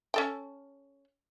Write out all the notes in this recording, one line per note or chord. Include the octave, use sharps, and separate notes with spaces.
C#4 A4 G5